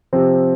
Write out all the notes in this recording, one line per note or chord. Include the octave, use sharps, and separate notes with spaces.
C3 F3 C4